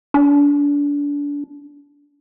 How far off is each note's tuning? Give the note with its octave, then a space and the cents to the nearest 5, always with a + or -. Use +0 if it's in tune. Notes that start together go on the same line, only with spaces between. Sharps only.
D4 -30